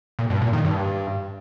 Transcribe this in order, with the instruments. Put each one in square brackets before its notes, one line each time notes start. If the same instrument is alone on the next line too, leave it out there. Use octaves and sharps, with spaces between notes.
[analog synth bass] A#2
G2
A#2
D#3
G2